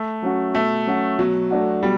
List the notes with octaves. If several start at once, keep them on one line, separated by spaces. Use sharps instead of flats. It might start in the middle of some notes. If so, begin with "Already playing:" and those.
Already playing: A3
F#3 C#4 F#4
B2 A3
F#3 C#4 F#4
B2 F#3
A3 D4 F#4
B2 G3